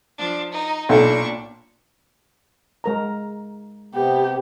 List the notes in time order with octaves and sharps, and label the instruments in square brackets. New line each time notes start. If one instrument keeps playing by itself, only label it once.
[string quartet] F3 D4
D#4
[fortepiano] B1 [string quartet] A#2 D4 C#6
[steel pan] G#3 A#4 A#5
[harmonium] C3 B3 [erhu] G4